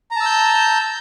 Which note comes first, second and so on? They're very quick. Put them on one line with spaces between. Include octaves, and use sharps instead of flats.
A#5 A5 E6 G6